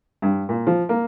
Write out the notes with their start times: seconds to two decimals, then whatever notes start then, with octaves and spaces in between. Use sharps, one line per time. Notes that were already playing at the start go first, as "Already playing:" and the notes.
0.22 G2
0.49 A#2
0.67 F3
0.89 A#3